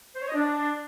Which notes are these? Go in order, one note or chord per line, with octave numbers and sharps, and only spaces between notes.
C5
C#5
D#5
D4